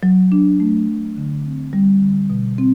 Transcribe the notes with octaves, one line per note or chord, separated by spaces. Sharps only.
F#3
D4
A3
F#3
D3
C4
G3
D3
B2
C4